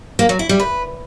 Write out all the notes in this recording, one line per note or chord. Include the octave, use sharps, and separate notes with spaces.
A#3
F#3
E4
G3
B4